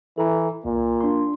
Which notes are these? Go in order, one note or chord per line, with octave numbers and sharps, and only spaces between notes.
E3 A4 A#5
C2 A#2
D4 C6